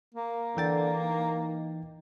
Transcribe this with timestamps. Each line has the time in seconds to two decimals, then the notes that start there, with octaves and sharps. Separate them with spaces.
0.14 A#3
0.57 D3 E3 G5 A6
1.05 D#4